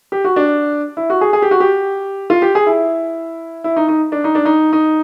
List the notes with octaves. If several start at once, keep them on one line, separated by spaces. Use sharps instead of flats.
G4
F#4
D4
E4
F#4
G#4
G#4
G4
F#4
G4
F4
G4
G#4
E4
E4
D#4
D#4
D4
D#4
D4
D#4
D#4